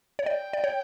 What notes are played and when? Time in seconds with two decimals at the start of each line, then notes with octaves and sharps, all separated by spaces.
0.19 C#5
0.26 D5 G5
0.53 D5
0.64 C#5